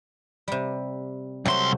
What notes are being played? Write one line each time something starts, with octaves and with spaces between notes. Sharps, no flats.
C3 G3
C2 F#3 A3 C4 C6